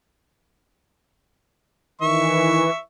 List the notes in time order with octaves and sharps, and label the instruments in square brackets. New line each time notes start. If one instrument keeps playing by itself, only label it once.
[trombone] D#3 [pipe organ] E3 [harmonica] E5 C#6